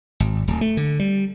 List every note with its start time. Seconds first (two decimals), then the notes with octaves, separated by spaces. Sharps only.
0.20 G#1
0.48 D1
0.61 A3
0.77 D3
0.99 G3